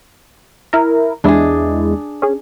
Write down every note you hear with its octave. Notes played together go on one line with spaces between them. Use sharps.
E4 A#4
E2 G#3 D4 E4 G#4
C#4 G#4